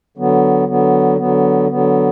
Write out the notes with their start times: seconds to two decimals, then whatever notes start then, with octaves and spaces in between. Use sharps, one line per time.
0.17 D3 F#3 B3
0.68 D3 F#3 B3
1.18 D3 F#3 B3
1.69 D3 F#3 B3